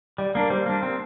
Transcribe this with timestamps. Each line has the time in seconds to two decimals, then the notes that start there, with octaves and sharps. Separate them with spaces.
0.18 G3 D5
0.35 A#3 D4 A#4
0.50 G3 C5
0.66 A#3 D4
0.83 C4